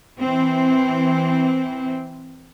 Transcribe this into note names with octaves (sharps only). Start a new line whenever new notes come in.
E3 C4